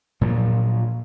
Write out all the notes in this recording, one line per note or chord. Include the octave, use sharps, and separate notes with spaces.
A#2 F3 F#3